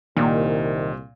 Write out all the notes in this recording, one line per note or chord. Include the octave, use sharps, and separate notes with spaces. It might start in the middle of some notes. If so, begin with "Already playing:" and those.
C2 A#2 D#3